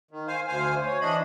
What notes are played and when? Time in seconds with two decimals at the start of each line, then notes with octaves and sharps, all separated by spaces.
0.11 D#3
0.28 C5 F5 G#5
0.48 D2 C5 F5 G#5
0.86 C#5
1.01 E3 D4 D#5 B5